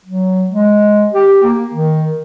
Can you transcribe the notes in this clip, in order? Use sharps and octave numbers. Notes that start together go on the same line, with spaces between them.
F#3
G#3
G4
A#3
D#3